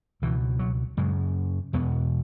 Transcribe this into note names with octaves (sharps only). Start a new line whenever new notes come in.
C#2 B2 E3
F#3
F#2 C#3 G#3
E2 B2 B3